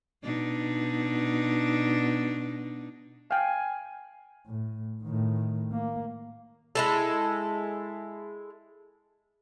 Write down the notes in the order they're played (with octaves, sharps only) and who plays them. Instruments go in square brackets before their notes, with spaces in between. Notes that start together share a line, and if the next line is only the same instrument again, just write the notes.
[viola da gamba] B2 D4 D#4
[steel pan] F5 G5 [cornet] G#5
[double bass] A2
A2 D#3
A#3
[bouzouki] G#3 E4 A4